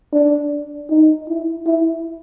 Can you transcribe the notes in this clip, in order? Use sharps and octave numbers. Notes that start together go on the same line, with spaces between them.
D4
D#4
E4
E4